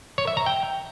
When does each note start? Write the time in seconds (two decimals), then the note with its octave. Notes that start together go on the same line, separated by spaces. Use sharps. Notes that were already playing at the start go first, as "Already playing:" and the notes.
0.18 C#5
0.27 E5
0.37 A#5
0.46 G5